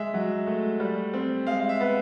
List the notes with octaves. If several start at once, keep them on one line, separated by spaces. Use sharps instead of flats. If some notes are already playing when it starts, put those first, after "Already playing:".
Already playing: G#3 E5
F#3
A3
G3
C4
G#3 F5
F5
E5
B3